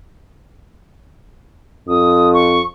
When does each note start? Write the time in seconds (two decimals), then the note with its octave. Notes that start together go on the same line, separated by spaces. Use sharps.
1.88 F2 D#6
2.34 C#6